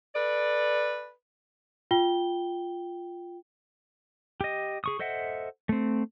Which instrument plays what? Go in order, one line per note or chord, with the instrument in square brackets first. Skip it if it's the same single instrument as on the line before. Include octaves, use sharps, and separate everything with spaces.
[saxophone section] A4 B4 D5
[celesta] F4 G5 G7
[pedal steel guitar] G4 D#5
G#4 C#6 D#6
A4 C5 D#5 E5 F#5
A3 C4